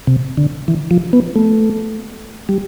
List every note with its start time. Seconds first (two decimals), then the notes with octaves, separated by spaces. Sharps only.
0.07 C3
0.37 D3
0.68 E3
0.91 F3
1.13 B3
1.36 A3
2.49 G3